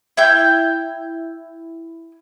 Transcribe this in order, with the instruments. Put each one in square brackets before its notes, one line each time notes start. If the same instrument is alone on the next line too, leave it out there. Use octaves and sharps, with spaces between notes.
[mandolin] E4 G5 G6